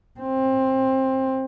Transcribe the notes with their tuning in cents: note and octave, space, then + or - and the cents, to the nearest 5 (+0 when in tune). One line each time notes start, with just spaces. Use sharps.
C4 +20